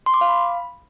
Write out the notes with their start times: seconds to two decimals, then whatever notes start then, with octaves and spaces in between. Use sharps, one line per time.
0.06 C6
0.14 D6
0.21 F5
0.29 B5